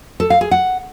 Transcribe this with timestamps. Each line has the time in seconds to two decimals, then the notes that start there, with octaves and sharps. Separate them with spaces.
0.20 A4
0.30 F5
0.41 G#4
0.51 F#5